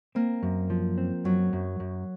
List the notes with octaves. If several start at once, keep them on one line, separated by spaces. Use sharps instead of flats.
A#3 C4
F#2
F3
C4
F#2 F#3
F#2
F#2